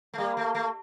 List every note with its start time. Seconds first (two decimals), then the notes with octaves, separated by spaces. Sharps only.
0.14 A3
0.18 G3 A#3
0.37 A3
0.55 A3